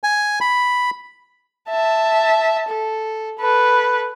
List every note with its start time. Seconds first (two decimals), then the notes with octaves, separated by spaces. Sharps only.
0.03 G#5
0.41 B5
1.70 E5 A5
2.69 A4
3.39 A4 B4